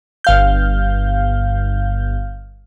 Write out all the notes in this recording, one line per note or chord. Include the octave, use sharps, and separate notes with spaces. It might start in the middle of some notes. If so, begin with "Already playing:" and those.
G1 F5 G6